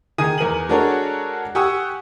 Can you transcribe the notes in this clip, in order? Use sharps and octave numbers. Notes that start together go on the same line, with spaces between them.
D#3 G#4 G#5 D#6 D#7
E2 A#4 D#7 F#7
G#3 D4 F#4 A4 A#4 C#5
G4 F#5 G#5 C#6 D#6 E6